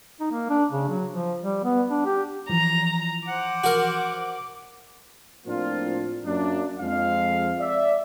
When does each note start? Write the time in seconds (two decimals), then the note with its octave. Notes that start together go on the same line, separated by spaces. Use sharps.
0.20 D#4
0.32 A#3
0.49 D4
0.71 C#3
0.89 F#3
1.12 F3
1.42 G3
1.64 B3
1.90 D4
2.05 G4
2.49 E3 F3 A#5
3.28 C5 F#5 D6
3.64 F#4 A#4
5.46 A2 F3 A#3 C4 D4 F4
6.25 F#2 A#3 D4
6.80 F2 F3 G#3 F5
7.59 D5 E5